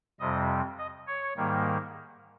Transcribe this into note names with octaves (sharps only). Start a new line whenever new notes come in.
F2 C3 G3 D#5
D#5
C#5
G#2 D#3 G3 A#3